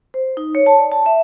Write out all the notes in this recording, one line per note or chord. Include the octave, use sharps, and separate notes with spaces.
C5
D#4
C#5
A5
D5
A5
E5